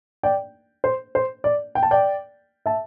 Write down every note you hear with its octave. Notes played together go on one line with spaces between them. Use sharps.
D5 G5
C5
C5
D5
G5
A5
D5 G5
E5 A5